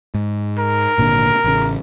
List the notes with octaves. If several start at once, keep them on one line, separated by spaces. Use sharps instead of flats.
G#2
A#4
G#1 A#2 D3
A1 C#3